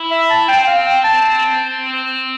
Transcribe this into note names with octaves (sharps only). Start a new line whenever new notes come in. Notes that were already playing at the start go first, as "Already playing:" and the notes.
Already playing: E4
E5
A5
C4 G5
G5
F5
G5
A5